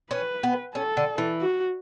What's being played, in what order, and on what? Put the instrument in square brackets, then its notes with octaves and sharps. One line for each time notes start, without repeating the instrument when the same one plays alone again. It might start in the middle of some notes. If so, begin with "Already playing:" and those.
[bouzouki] C#4 [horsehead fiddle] B4
[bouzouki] B3
[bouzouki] C#4 [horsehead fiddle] A4
[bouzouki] D3
E3
[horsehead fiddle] F#4